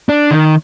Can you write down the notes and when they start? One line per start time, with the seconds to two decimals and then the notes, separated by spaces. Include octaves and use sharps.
0.09 D4
0.31 D#3